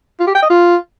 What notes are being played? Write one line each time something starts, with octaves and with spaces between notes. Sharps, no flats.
F4
G4
G5
D#5
F4